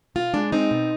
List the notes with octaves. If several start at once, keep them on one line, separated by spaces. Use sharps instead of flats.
B2 F4
G#3 D4
C4 D#4
B2